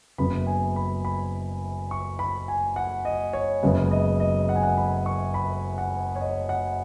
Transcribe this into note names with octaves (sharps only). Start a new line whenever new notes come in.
F#1 F#2 C#3 B3 B5
G#5
B5
B5
C#6
B5
G#5
F#5
D#5
C#5
F#1 F#2 C#3 G#3 B3
D#5
D#5
F#5
G#5
F#5
B5
C#6
B5
F#5
C#5
D#5
F#5